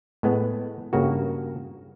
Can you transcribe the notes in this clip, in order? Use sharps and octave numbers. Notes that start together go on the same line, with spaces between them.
A2 G#3 B3
G2 C#3 A#3 F#4